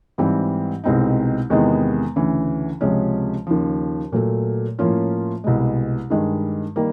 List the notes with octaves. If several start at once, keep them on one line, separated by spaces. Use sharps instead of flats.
G#2 E3 G3 C4
C2 B2 G#3 C4 D#4
E2 C3 D#3 G#3 B3
D2 C#3 E3
C#2 C3 F3 G#3 C#4
D#2 C#3 F3
A#2 F#3 A3
A2 F3 A#3 C#4 F4
C2 B2 G#3
G2 D#3 G#3
D#3 G3 A#3